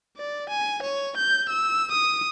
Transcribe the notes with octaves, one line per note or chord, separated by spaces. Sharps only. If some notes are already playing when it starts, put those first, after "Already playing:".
D5
G#5
C#5
G6
E6
D#6